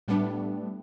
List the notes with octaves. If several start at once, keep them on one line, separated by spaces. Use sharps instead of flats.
A2 G3 A3 B3 D4